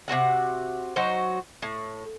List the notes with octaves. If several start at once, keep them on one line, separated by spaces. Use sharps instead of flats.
C3 C4 F#4 F#5
F#3 D#4 F#4 C5
A2